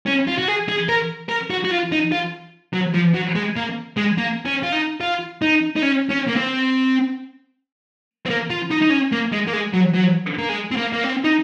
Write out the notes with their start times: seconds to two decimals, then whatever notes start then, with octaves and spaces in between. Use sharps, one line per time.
0.06 C#4
0.27 F4
0.38 F#4
0.48 G#4
0.69 G#4
0.89 A#4
1.29 A#4
1.50 F#4
1.65 F#4
1.71 F4
1.92 D#4
2.12 F4
2.74 F#3
2.94 F3
3.14 F#3
3.36 G#3
3.57 A#3
3.97 G#3
4.18 A#3
4.46 C#4
4.63 F4
4.72 D#4
5.01 F4
5.42 D#4
5.76 D#4
5.83 C#4
6.11 C#4
6.29 A#3
6.37 C4
8.26 C4
8.30 A#3
8.50 F4
8.71 D#4
8.82 D#4
8.91 C#4
9.12 A#3
9.32 G#3
9.47 A#3
9.53 G#3
9.74 F#3
9.95 F#3
10.38 A#3
10.49 G#3
10.71 C4
10.77 A#3
10.93 A#3
11.04 C4
11.24 D#4